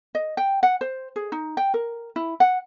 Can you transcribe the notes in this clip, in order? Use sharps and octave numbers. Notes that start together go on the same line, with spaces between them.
D#5
G5
F#5
C5
G#4
D#4
G5
A#4
E4
F#5